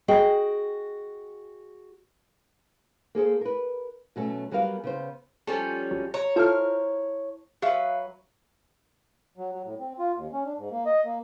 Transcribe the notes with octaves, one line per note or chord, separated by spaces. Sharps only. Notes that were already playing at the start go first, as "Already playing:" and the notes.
F#4 G#4 D#5 G5
A#3 G#4 A4 C5
A#4 B4
B2 F#3 A3 C#4
F#3 G3 B3 A#4 F5
C#3 B3 C5
F3 G3 C#4 A4
G#1 F#3
C#5 A#5
E4 F4 A4 C5 A5 F6
F#3 B4 E5 F5
F#3
F#3
A2
C4
F4
D#2
C#4
D4
G#2
A#3
D#5
A#3